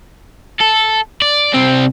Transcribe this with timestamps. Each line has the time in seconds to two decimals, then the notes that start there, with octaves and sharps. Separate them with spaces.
0.60 A4
1.22 D5
1.54 C2 C4